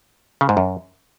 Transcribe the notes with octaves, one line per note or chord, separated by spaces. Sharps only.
C#3
G#2
F#2